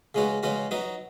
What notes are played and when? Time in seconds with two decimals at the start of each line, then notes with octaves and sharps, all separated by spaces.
0.15 C#3 G#3 C#4 F#4 B4
0.43 C#3 G#3 C#4 F#4 B4
0.71 F#3 D#4 B4